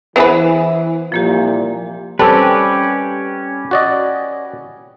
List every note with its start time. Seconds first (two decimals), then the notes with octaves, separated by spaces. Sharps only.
0.16 E3 B3 G#4 B4 C5 E5
1.12 C2 A#2 F3 A#3 G4
2.19 G3 C4 C#4 G4 A4 B4
3.71 F#4 D5 D#5